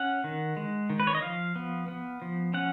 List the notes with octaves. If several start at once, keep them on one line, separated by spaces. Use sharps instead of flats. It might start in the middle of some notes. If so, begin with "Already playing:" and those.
Already playing: C#4 F#5
D#3
G#3
D#3
B4
C#5
D#5
F3 F5
B3
B3
F3
C#4 F#5